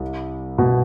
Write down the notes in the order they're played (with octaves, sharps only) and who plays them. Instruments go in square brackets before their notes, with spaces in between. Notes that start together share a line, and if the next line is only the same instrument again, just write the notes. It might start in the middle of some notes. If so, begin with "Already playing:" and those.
Already playing: [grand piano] C2 G3
[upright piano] B2